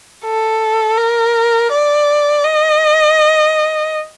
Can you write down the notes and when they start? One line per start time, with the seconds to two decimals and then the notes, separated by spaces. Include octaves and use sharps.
0.25 A4
0.98 A#4
1.72 D5
2.44 D#5